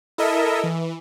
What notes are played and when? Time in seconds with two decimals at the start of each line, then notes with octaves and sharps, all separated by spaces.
0.18 E4 A4 A#4 D#5 E5
0.63 E3